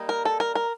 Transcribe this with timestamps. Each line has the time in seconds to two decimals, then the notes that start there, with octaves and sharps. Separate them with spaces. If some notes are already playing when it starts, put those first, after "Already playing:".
Already playing: G3 A#3 D#4
0.09 A#4
0.25 A4
0.40 A#4
0.55 A#4